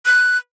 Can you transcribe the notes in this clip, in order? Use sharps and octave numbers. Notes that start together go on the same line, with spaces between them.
F#6